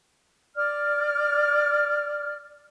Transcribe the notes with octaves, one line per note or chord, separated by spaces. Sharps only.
D5 F6